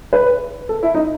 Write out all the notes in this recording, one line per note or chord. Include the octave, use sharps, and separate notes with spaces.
B4
A4
E4
D#4